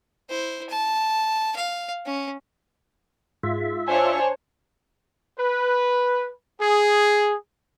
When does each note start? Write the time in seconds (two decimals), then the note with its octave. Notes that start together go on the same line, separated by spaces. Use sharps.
0.29 E4 C5
0.70 A5
1.56 F5
2.06 C#4
3.43 G#2 F4 E5
3.88 D4 C5 C#5 G#5
5.39 B4
6.61 G#4